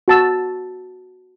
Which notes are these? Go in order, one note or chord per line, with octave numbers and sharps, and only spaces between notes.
F#4 A5 E6